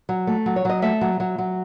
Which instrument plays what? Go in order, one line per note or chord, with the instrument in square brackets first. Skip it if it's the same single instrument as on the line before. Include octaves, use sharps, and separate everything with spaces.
[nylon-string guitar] F#3
A3
F#3
C#5
F#3 D#5
A3 E5
F#3
F#3
F#3